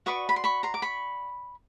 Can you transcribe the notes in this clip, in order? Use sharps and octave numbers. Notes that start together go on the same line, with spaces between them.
F#4 B4 D5 C#6 D#6
B5
C6
B5 C#6
A#5 C6
D6
B5 C#6